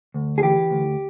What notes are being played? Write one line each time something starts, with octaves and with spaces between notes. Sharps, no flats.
D2
G#4
E3 G4
D2